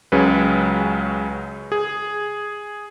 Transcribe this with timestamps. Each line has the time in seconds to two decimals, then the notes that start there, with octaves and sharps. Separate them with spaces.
0.12 C#2 C#3 F#3 C#4 B4
1.72 G#4